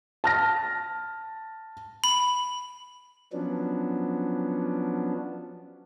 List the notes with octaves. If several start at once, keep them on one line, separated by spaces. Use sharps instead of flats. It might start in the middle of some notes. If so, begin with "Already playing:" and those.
A5 F6 A#6
B5
F3 F#3 B3 C#4 D4